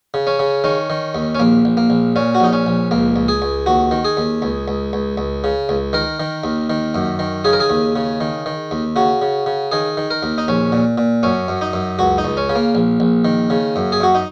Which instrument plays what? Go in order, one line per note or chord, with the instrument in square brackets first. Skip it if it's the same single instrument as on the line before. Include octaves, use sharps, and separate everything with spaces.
[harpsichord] C#3
C#4
C#3
D#3 C#4
D#3
D#2
C#4
A#1 A#3
A#1
A#3
A#1
A#2 C#4
F#4
A#1 D#4
C#4
A#1
C#2 A#3
C#2
G#4
C#2
D#2 F#4
D#3
G#4
D#2
C#2
C#2
C#2
C#2
C#3
C#2
D#3 A#4
D#3
D#2
D#3
F#2
D#3
C#3 G#4
A#4
G#4
D#2
C#3
D#3
D#3
D#2
C#3 F#4
C#3
C#3
D#3 G#4
D#3
A#4
D#2
D#4
A#1 C#4
A#2
A#2
F#2 C#4
F#2
D#4
F#2
C#2 F#4
D#4
C#2
C#4
C#3
A#3
A#1
A#1
D#3
C#3
F#2
G#4
F#2 F#4
D#4